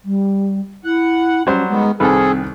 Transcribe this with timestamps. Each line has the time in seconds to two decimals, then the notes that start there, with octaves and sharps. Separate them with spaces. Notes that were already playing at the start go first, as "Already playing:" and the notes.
0.04 G3
0.84 E4 F#5
1.47 F#3 G3 C#4 C5
1.69 D#3 G#3 B3
2.00 C2 D#3 C4 G#4 A4 B4